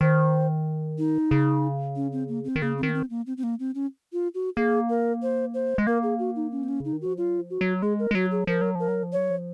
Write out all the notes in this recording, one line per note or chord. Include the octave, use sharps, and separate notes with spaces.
D#3 C5
D#4
C#3
C#4
C4
A#3
C4
D#3
C#3 A#3
C4
D#3
A#3
C4
A#3
C4
C4
A#3
C4
C#4
F4
F#4
A#3 G#4
A#4
C5
C5
G#3
A#3 A#4
G#4
F#4
D#4
C#4
C4
C#4
C#3 D#4
D#3
F3 F#4
F#3 F4
F3
F#4
F#3
G#3 G#4
A#4
G#3
F#3 F#4
G#4
F3 A#4
F#3
F3 A#4
F#3
F3
F#3 C#5
F3